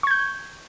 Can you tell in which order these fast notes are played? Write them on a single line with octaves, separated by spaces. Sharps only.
C#6 G#6 G6